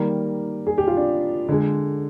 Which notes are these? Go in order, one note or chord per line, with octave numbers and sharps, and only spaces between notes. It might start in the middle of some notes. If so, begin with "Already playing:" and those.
Already playing: D#3 G3 A#3 A#4
G#4
G4
F4
D4
D3 G#3